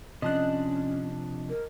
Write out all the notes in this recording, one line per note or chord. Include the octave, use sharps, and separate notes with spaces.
C3 F3 C#4 D4 D#5 A5 F#6
A#4